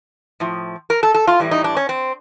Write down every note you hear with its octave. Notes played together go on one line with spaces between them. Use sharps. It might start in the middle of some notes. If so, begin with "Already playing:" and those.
A2 F3
A#4
A4
A4
F4
A2 E3 G3
D#4
D4
C#4
C4